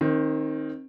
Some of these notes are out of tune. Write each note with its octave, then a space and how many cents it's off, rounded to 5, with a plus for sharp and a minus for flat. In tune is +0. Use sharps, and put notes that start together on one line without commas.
D#3 +0 C4 +25